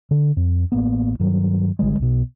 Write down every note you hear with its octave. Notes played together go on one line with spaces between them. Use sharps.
D3
F2
A1 A#3 B3
G2 D#3 F#3
G#1 D3 G3 G#3
B1 B2